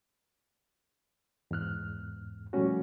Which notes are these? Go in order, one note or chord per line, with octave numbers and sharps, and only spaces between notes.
E2 G#2 F6 F#6
A#2 F3 G3 A3 C#4 F#4